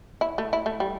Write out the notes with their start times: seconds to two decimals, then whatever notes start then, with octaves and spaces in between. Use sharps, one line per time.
0.21 E4
0.38 A3
0.53 E4
0.66 A3
0.80 G3